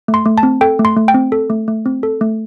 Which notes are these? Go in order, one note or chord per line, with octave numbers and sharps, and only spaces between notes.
A3
C6
A3
A5
C4
A4 G5
A3
C6
A3
G5
C4
A4
A3
A3
C4
A4
A3